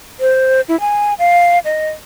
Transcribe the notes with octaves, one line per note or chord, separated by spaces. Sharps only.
C5
E4
G#5
F5
D#5